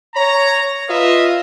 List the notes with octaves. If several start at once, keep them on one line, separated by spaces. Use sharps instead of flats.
C#5 A#5
F4 B4 D#5 E5